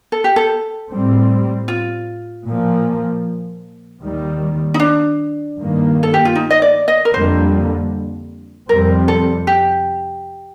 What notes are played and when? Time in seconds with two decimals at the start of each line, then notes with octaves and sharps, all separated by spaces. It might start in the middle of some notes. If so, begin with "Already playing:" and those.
0.12 A4
0.24 G4
0.36 A4
0.90 A2 G3 C4
1.68 F4
2.46 A#2 F3 A#3
4.02 D#2 D#3 G3
4.74 D#4
4.80 D4
5.58 G2 D#3 A#3
6.03 A4
6.14 G4
6.25 F4
6.35 D#4
6.50 D#5
6.62 D5
6.88 D#5
7.05 A#4
7.13 F2 D3 G3 A#3 C5
8.69 F2 C3 G3 C4 A#4
9.08 A4
9.47 G4